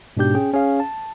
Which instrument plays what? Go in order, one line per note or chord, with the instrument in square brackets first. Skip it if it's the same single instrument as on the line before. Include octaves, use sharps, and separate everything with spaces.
[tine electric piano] G#2 B2 D4 G4 G6
C#4 G#4 G5
C#4 G#4 F5
A5